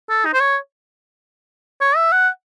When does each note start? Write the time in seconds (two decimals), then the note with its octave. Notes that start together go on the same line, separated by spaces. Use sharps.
0.09 A4
0.25 D#4
0.33 C5
0.40 C#5
1.81 C#5
1.96 E5
2.12 F#5